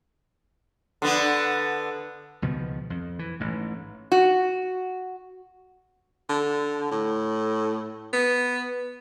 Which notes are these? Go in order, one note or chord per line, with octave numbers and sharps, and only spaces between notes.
D3 B3
C#2 B2 D#3 F3
F2
E3
A1 G#2
F#4
D3
A2
B3